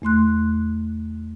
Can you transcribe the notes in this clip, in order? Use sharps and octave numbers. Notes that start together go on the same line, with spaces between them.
E2 A3 C6 F#6